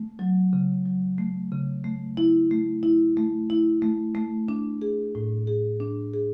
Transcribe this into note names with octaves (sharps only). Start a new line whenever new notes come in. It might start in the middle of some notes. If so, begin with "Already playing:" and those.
Already playing: A3
F#3
C#3
F#3
A3
C#3
A3
E4
A3
E4
A3
E4
A3
A3
D4
G#4
A2
G#4
D4
G#4